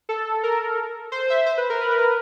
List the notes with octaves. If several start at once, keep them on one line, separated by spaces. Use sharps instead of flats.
A4
A#4
C5
E5
C5
B4
A#4
B4
A#4
B4